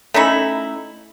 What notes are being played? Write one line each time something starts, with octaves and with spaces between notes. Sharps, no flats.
A3 C#4 D#4 E4